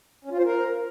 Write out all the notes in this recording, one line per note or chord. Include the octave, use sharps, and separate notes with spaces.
C#4
F4
C5
A#4